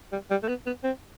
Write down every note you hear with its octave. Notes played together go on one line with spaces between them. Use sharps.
G3
G3
A3
B3
B3
C4